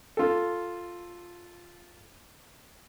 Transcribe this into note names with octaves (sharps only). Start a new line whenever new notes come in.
F4 A4